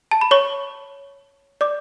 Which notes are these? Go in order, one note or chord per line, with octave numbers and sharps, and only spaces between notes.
A5
B5
C#5 C#6
D5 D6